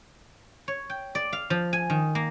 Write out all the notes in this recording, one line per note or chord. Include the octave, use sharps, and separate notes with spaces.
C#5
G5
D5
F5
F3
G#5
D#3
A#3